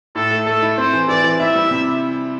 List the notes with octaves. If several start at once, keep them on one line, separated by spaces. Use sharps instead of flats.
A2 A4
A3
A3 A4
E4
C4 C5
E3
E3 D5
E3
E4 E5
G3
C3